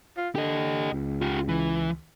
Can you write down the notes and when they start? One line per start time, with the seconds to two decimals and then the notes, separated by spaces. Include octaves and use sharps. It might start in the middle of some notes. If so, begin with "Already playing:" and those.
0.17 F4
0.35 D3 G4 D#5
0.92 C#2
1.22 F4 G4
1.49 E3